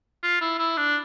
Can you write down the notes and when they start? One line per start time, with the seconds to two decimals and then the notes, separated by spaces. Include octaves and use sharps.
0.23 F4
0.41 E4
0.59 E4
0.77 D4